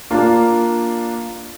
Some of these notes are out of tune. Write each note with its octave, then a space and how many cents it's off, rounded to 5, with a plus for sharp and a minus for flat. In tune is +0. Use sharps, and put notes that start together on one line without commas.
A#3 +0 D4 +0 F4 +0